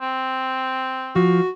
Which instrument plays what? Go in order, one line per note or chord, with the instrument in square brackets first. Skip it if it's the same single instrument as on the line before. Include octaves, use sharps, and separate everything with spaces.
[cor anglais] C4
[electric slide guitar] F3 [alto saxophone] F#4